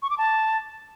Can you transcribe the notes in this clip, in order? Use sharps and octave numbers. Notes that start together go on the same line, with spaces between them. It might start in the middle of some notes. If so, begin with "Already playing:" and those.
C#6
D6
A5